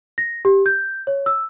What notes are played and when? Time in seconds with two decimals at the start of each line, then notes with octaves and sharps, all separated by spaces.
0.18 A#6
0.45 G4
0.66 G6
1.07 C#5
1.26 E6